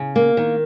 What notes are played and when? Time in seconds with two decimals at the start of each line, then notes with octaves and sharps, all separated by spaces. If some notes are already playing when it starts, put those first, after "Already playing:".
Already playing: C#3
0.16 A#3
0.37 D#3